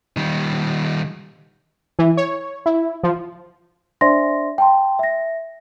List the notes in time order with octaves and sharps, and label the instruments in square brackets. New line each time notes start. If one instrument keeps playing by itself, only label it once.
[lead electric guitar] D#3 G3
[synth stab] E3
C#5
E4
F3
[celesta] D4 C5 D5 E5 C6 A#6
G5 A5 C6
E5 A#6